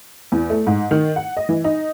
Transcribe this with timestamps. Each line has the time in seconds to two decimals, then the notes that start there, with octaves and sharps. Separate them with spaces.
0.32 E2
0.50 A3
0.67 G#2
0.91 D#3
1.16 F#5
1.37 D#5
1.49 E3
1.64 D#4